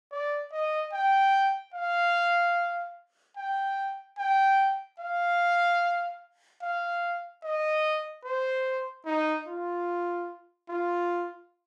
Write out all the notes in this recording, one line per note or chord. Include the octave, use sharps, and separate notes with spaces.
D5
D#5
G5
F5
G5
G5
F5
F5
D#5
C5
D#4
F4
F4